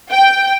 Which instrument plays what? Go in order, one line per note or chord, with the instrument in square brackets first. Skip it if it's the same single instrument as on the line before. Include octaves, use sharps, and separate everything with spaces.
[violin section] G5